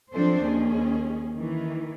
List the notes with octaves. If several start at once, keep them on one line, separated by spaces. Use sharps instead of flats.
F3 C4 D4 A4 C5
D#2 C#4 G#4
D#3 E3